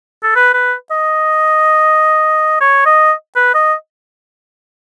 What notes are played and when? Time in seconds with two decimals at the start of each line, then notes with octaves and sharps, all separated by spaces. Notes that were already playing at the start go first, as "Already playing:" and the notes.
0.23 A4
0.35 B4
0.54 B4
0.91 D#5
2.61 C#5
2.86 D#5
3.36 B4
3.54 D#5